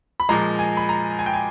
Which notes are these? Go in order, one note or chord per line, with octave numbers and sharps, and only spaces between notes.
B5
A#2 F3 G#3 A#5
G#5
B5
A#5
G#5
G5
G#5